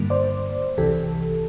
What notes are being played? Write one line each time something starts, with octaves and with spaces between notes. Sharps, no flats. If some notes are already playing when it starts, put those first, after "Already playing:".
Already playing: G2 D3 G3 A#3
C5 D5
C2 C3 E3 G4 A4